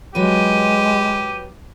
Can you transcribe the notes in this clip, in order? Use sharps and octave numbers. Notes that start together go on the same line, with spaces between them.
F#3 G#3 G4 B4 D#7